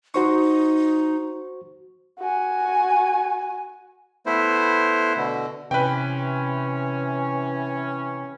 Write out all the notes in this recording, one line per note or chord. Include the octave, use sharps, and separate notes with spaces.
D#4 F#4 C5 C#6
F#4 G#5
A3 B3 E4 C5
B2 D3
C3 E3 C#4 B4 G5